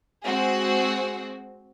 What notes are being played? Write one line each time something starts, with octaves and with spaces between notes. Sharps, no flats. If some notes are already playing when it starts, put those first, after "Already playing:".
G#3 C4 F#4 G#4